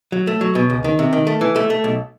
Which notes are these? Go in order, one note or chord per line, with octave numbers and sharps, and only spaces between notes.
F#3
A3
F#3
B2
C#2
D#3
C3
D#3
A3
E3
A3
A3
B1